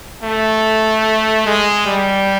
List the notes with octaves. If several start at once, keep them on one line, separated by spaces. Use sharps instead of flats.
A3
G#3
G3